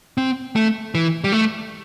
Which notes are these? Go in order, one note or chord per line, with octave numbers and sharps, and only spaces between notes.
C4
A3
E3
G3
A3